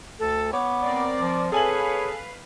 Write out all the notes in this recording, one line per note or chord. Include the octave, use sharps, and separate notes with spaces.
D2 A4
B3 C#5 D6
C4 A#4 D5
F3
G#4 A4 B4 C#5 F5 G#5 F#7